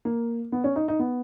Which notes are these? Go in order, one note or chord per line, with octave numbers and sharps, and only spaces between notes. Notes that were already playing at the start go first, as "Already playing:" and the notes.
A#3
B3
C#4
D#4
D#4
B3